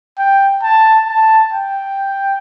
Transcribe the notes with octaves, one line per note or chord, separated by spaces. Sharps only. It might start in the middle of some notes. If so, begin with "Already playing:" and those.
G5
A5
A5
G5